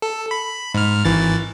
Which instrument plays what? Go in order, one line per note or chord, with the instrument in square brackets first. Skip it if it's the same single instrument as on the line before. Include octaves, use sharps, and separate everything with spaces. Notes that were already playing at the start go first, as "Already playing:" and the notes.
[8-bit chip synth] A4
B5
G#2 F6
G#1 E3 A6